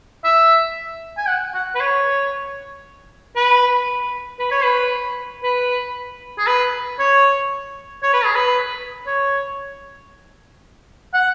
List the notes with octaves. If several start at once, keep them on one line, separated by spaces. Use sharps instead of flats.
E5
G#5
F#5
F#5
B4
C#5
B4
B4
C#5
B4
B4
G#4
B4
C#5
C#5
B4
G#4
B4
C#5
F#5